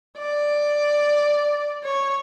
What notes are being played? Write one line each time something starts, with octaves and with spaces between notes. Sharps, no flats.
D5
C#5